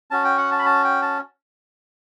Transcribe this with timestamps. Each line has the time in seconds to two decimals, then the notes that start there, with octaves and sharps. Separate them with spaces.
0.11 C#4 F#4 A5
0.25 G5
0.38 F#5
0.51 A5
0.59 B5
0.65 A5
0.84 G5
1.02 A5